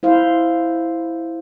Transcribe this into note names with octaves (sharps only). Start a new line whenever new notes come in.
E4 C5 F5